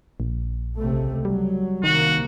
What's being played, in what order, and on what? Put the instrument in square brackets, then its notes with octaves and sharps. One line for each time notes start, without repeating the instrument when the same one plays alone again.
[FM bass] A#1
[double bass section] C#2 C3 A3
[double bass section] F#3 [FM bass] G3
[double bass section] C2 A#3 [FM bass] D#3 [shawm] F#4